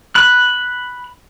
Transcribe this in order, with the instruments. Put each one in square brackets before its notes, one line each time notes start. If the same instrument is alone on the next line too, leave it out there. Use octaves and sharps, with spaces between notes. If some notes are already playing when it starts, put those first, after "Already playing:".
[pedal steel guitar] B5 F#6